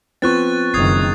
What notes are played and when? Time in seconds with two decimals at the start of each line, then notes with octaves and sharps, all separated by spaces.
0.22 F3 B3 C4 C#6 F#6 A6
0.74 F#1 D#3 D#6 G#6 C7